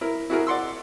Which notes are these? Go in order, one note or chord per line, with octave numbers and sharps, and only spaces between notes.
E4 A#4
E4 F#4 G#4 A#4
D5 F#5 C6 E6